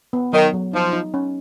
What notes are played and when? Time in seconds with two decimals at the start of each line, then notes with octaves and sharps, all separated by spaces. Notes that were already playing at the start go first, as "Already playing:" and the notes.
0.13 B3
0.33 D#3 F#3
0.54 F#3
0.73 F3 D#4
0.93 D#4
1.14 C#4